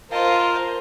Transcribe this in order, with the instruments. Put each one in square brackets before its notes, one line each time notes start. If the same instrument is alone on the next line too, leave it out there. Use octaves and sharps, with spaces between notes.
[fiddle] F4 D#5 [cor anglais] A#4 [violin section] C5 [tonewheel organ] F5 A5 C6